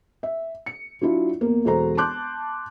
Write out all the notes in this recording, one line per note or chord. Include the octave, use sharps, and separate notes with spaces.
E5
C#7
F#3 D4 E4 F4
E2 A#3
E1 F#3 F#4 A4 C5 A#5
A5 C6 D6 F#6 G6